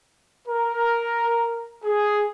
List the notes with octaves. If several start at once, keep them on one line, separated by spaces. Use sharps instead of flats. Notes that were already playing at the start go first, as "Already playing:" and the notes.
A#4
G#4